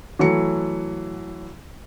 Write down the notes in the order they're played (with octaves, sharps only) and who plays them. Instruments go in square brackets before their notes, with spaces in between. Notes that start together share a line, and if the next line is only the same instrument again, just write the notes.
[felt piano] E3 F#3 A3 C#7